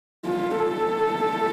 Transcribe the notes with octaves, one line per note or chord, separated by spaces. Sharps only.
F4
A4